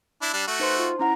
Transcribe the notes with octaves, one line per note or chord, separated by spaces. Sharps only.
D4 E4
G3 D4
A3 F#4
D#4 B4 C5 C6
F4
C#4 E4 F#5 A#5